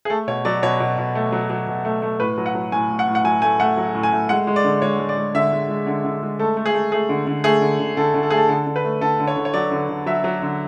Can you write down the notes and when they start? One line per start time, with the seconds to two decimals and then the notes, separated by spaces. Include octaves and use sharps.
0.05 G#4
0.10 A3 A4
0.28 B2 C#5
0.45 F#3 D5
0.62 B2 C#5
0.80 B2
0.98 B2
1.15 A3
1.32 F#3
1.50 F#3
1.67 B2
1.85 A3
2.02 A3
2.20 A2 B4
2.38 F#3
2.46 F#5
2.55 F#3
2.72 A2 G#5
2.90 A2
2.99 F#5
3.08 A2
3.15 F#5
3.24 F#3 G#5
3.42 A3 G#5
3.60 A3 F#5
3.77 F#3
3.95 A2
4.03 G#5
4.13 A3
4.29 G#3 F#5
4.47 G#3
4.56 D5
4.64 D3
4.82 G#3 C#5
4.99 G#3
5.09 D5
5.17 G#3
5.35 D3 E5
5.52 G#3
5.69 G#3
5.87 D3
6.05 D3
6.22 G#3
6.39 A3 A4
6.57 A3
6.66 G#4
6.74 A3
6.92 A3 G#4
7.09 D3
7.27 D3
7.44 A3 G#4
7.62 D3
7.80 D3
7.97 D3 A4
8.14 D3
8.23 A4
8.30 A3 G#4
8.37 A4
8.49 D3 A4
8.67 D3
8.76 B4
8.84 A3
9.01 D3 A4
9.20 D3
9.28 C#5
9.36 D3
9.45 C#5
9.54 F#3 D5
9.72 D3
9.89 D3
10.06 F#3 E5
10.24 F#3
10.42 D3